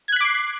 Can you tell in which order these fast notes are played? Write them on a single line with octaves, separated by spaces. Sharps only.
G#6 F#6 B6 D6 C7